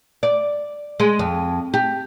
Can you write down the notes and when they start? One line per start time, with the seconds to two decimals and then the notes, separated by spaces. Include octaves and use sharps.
0.23 D5
1.00 G#3
1.19 F2
1.74 G4